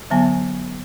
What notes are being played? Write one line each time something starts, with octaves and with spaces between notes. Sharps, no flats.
D3 F#3 B3 G#5